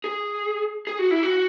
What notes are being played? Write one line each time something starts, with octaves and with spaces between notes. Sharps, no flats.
G#4
G#4
F#4
E4
F#4